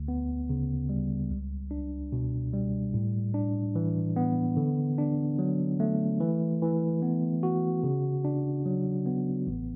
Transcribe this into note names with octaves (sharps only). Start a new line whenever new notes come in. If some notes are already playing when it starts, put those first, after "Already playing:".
Already playing: D2
B3
C#3
G3
C#2
D4
B2
G3
A2
D4
E3
B3
D3
D4
F#3
A3
E3
E3
B3
F#4
C#3
D4
F#3
B3
A1